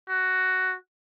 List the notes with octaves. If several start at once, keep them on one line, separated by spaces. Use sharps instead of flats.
F#4